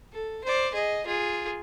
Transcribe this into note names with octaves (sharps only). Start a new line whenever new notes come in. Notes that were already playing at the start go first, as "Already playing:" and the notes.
A4
C5 D5
G#4 D#5
F4 G#4